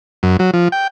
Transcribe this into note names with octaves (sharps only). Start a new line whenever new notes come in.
F#2
F#3
F3
G5